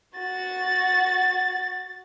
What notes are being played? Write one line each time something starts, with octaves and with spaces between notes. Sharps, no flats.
F#4 A6